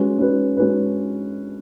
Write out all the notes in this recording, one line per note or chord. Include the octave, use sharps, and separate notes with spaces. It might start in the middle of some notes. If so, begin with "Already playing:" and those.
Already playing: G#3 C#4 F#4 B4
G#3 C#4 F#4 B4
G#3 C#4 F#4 B4